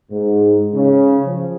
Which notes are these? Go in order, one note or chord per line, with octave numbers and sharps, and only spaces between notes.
G#2
C#3
F3